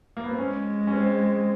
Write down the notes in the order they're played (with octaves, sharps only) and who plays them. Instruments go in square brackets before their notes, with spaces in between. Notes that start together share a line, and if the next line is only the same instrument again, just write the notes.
[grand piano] A#3
B3
C4
[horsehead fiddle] G#3 [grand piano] C#4
[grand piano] C#4
C4